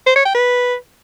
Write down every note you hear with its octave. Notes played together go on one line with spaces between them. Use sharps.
C5
C#5
G5
B4